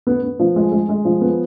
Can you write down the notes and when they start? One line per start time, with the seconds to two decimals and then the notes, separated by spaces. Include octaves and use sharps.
0.07 B3
0.23 B3
0.39 F3
0.56 G#3
0.72 G#3
0.89 G#3
1.05 F3
1.21 B3